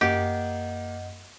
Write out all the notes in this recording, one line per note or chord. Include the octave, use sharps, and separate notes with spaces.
F#2 A#3 G4 D#5 F#5 G6